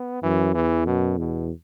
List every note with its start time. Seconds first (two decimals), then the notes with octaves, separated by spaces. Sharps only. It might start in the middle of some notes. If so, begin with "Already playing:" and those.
Already playing: B3
0.23 F#2 E3
0.54 E2 E3
0.86 F#2 B2
1.18 E2 B2